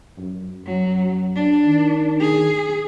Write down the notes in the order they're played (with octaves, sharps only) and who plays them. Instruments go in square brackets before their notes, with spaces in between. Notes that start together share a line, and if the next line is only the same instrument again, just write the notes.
[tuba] F#2
[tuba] F#2 [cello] F#3
[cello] D4
[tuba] D#3
[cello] G#4